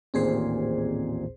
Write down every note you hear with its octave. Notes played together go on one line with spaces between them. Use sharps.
A1 D#2 A#2 C4 G#4 C5